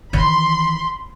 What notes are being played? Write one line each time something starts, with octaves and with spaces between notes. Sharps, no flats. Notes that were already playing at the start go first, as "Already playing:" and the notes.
D#3 E3 B5 C6